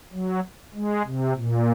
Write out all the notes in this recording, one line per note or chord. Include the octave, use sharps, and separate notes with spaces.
F#3
G#3
C3
A#2